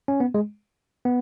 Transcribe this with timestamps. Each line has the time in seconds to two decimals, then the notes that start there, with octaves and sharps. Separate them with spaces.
0.08 C#4
0.20 B3
0.34 G#3
1.05 B3